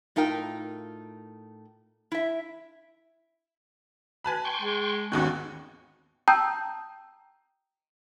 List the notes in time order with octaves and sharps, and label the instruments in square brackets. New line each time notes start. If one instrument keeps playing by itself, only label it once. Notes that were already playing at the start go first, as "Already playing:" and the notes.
[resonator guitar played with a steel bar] A2 D#4 F4 A#4 G5
E4 E5
[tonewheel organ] B4 [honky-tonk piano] G#5 A5 B5
[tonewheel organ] G5 C6 C#6
[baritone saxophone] G#3
[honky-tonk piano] G#1 D#2 D#3 [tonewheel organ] B3 C#4 F#4
[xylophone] G5 A5 A#5 D#6 E6 G6